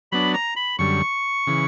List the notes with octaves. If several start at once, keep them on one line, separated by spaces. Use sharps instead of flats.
F#3 B3 D4 B5
A#5
B5
F#2 D3 G3 C#6
C#3 E3